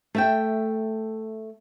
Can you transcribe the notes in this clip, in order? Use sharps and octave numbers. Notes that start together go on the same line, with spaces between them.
A3 E5 G5